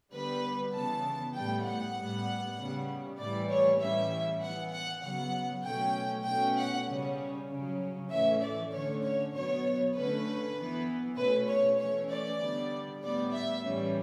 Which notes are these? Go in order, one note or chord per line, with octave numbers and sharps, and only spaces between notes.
D3 G3 B3 B4
C#3 E3 B3 A5
A2 G3 B3 G5
F#5
A2 G3 B3
C#3 G3 B3
A2 E3 G3 D5
C#5
A2 E3 G3 C#4 E5
E3 B3 F#5
F#5
C#3 F#3 B3 F#5
B2 F#3 A3 C#4 G5
B2 A3 C#4 G5
F#5
C#3 G3 C#4
C#3 F#3 C#4
A2 E3 A3 C#4 E5
D5
D3 A3 C#4 C#5
C#5
B2 F#3 B3 C#5
D3 A3 C#4 B4
E3 B3
B2 A3 C#4 B4
C#5
E3 A3 C#4 C#5
D5
D3 G3 B3
A2 G3 B3 D5
E5
A2 E3 G3 C#4